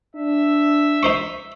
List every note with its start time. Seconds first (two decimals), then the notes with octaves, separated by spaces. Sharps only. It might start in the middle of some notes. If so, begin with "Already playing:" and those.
0.15 D4 E5
1.03 D#4 C5 C#6